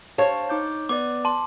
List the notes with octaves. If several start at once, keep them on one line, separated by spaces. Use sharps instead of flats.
C5 C#5 F5 A5
D#4 D6 G6
B3 B4 D5 D6
A5 C6